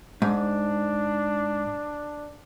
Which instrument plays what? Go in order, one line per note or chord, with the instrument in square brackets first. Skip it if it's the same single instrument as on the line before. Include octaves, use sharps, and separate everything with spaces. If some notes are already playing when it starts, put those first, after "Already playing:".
[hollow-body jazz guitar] G#2 [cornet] D4